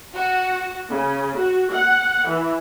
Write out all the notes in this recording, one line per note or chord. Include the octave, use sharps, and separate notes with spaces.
F#4
C#3
F#4
F#5
E3